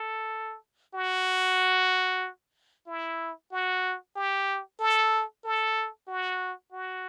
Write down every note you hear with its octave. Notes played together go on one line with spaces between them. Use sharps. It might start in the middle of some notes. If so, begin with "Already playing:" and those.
Already playing: A4
F#4
E4
F#4
G4
A4
A4
F#4
F#4